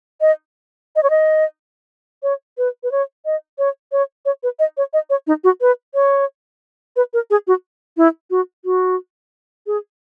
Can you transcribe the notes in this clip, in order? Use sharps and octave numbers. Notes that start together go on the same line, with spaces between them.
D#5
D#5
C#5
D#5
C#5
B4
B4
C#5
D#5
C#5
C#5
C#5
B4
D#5
C#5
D#5
C#5
D#4
F#4
B4
C#5
B4
A#4
G#4
F#4
E4
F#4
F#4
G#4